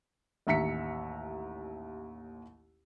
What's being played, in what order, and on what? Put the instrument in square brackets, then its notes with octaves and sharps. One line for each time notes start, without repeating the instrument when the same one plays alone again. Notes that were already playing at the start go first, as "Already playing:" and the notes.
[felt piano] A1 D#2 E5 A#5 B6 C#7